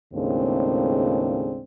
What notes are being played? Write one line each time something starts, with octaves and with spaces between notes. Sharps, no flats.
D#2 A2 C#3 G#3 C4 D4